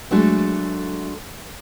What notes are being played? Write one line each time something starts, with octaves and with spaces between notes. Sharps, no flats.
F#3 G#3 A3 D4 F#4 A4